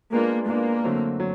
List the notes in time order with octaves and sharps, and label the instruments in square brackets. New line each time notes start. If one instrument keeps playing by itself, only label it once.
[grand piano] G#3 B3 D4 F4 [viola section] A#3
[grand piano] G#3 B3 D4 F4 [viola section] A#3
[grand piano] D3 F#3 A3 C4
F#3